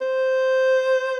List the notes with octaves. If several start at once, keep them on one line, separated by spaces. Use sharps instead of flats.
C5